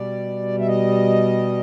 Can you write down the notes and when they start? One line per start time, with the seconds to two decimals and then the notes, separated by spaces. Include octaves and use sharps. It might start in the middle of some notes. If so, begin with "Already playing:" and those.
Already playing: B2 G3 D5
0.60 E5
0.67 D#5